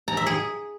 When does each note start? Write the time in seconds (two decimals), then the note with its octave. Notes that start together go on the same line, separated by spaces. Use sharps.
0.08 A#5
0.17 E5
0.26 G#4